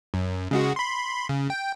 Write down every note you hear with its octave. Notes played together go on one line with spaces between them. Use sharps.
F#2
C#3 G#3 F#4
B5 C6
C#3
G5